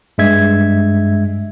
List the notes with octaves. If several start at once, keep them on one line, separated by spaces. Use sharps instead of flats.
G2 G#3 E5 G#6